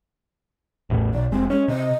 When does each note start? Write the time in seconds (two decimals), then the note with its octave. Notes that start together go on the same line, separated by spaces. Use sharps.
0.90 A1 E2 A2
1.14 B1 D5
1.32 F1 G#3 C4
1.50 G#3 C#4
1.68 C3 D#5